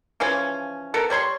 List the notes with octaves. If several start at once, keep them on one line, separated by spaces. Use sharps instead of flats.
C#3 E3 F3 C#4
B3 A4 A#4
G3 C#5 B5 C6